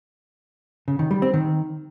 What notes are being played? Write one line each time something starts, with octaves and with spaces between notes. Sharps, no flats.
C#3
D#3
G3
C4
D#3